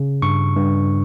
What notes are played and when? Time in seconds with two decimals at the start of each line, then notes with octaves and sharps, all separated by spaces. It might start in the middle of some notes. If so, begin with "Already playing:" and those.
Already playing: C#3
0.22 G2 C#6
0.56 G2